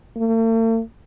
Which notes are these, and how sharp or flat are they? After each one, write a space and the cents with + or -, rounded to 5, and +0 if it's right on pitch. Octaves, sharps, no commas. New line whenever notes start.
A3 +45